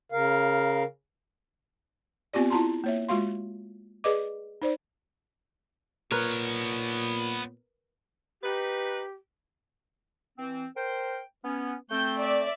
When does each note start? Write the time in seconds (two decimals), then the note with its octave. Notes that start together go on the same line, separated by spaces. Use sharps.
0.12 C#3 A#4 F5
2.33 B3 C4 F4 G4 D5
2.50 E4 F4 A5 A#5 C6
2.84 A#3 C#5 E5
3.09 G#3 F4 F#4 F5 C6
4.04 G#4 B4 D5 D#5 D6
4.62 D#4 C5 D5
6.11 A#2 B3 A#4 B4 C#5
8.42 D#4 G4 B4
10.38 E3 C4
10.76 A#4 C5 G5
11.44 B3 C#4
11.90 A3 C4 G6
12.19 D5 E5